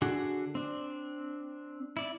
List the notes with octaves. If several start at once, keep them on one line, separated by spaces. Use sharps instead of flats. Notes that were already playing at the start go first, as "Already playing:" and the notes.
D3 D4 F#4 G#4
C4 D4
E4 D5